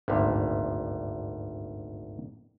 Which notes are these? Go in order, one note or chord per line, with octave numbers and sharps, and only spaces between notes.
G#1 D2 G2 A#2